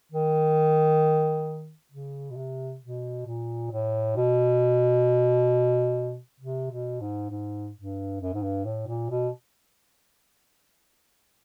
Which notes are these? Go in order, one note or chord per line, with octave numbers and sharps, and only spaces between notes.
D#3
C#3
B2
C3
B2
A#2
A2
B2
C3
B2
G#2
G#2
G2
F#2
G#2
G2
A2
A#2
B2